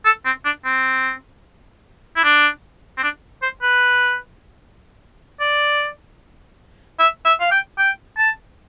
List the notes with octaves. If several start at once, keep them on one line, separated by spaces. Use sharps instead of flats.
A4
C4
D4
C4
E4
D4
C4
D4
C5
B4
D5
E5
E5
F5
G5
G5
A5